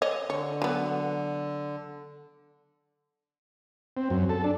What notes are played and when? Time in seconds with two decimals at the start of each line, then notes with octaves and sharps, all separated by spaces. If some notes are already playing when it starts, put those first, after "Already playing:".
0.02 C#5 D#5
0.30 D3 C#5
0.62 F#3 B3
3.97 C4
4.10 F#2
4.29 A4
4.44 D4